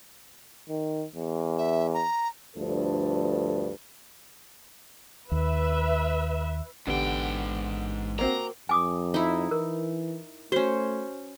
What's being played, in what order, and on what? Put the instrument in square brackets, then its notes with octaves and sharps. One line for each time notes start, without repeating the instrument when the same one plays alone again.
[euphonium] D#3
E2
[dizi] E5
A#5
[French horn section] D2 G2 F3 A4
[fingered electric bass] D#2 [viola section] B4 E5
[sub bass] A1 [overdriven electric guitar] G#2 G5 [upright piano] D3 B3 G4
[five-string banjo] A#3 C4 F#4 [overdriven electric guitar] A#5
[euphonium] F2 [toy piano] G#5 D6 D#6
[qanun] D#4 E4
[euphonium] E3 [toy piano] A#4
[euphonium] A3 [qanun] C#4 C5 [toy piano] F#4